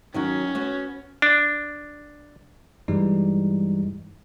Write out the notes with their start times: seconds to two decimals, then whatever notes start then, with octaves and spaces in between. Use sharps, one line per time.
0.14 D#3 F#3 C#4 F#4
0.55 B3 F#4 C#5
1.22 D4
2.88 G2 E3 G3 G#3 D#4